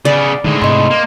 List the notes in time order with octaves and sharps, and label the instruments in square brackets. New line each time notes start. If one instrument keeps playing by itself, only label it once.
[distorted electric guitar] C#3 B3 [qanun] D5
[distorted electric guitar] A2 G#3 [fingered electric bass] D3 D#3
[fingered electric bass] G#2 C3 [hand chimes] D#5 C6
[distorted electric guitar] A#3